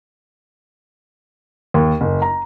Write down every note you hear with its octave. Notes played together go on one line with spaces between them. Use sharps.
D#2
F#1
A#5